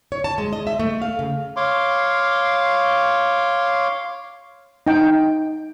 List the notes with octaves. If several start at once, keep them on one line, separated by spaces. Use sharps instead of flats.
C#5
A5
G#3
D#5
E5
A3
F5
C#3
C#5 F5 C6 D6
D#4 G5